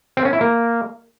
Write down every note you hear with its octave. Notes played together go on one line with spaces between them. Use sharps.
C4
C#4
E4
A#3